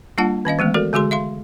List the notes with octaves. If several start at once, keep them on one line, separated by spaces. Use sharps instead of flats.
G3 A#3 D4 F4 F#5 A5
D#3 C#4 D#5 F5
E3 G#3 A3 B3
F#4 A4 A#4 D5
D3 G#3 F#4 G#4 C6
E5 F5 C6